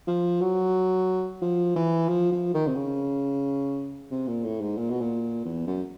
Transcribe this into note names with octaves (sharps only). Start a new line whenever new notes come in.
F3
F#3
F3
E3
F3
F3
D#3
C3
C#3
C3
A#2
A2
G#2
A#2
B2
A#2
E2
F#2